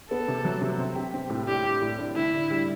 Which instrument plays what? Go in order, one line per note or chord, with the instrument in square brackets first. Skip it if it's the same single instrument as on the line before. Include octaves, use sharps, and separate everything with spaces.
[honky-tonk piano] B3 [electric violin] A4
[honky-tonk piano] C3
F#3
C3
C4
G4
C4
A2
[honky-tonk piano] D4 [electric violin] G4
[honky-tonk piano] A2
A2
D4
[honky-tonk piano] D3 [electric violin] E4
[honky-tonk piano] D3
G3